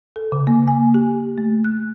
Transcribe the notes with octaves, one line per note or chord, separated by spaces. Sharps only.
A4
C#3
A#3
G#5
G4
A3
F#6